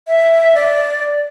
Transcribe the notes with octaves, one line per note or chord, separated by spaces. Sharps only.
E5
D5